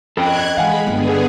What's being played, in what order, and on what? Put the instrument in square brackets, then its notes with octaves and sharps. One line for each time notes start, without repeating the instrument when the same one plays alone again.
[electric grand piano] F2 [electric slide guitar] A4 D#5 G5 [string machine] F#6 G#6
[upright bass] E3 [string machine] G#3 B5 [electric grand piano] F5 F#5 G#5
[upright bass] G1 [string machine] D3 B3 G#4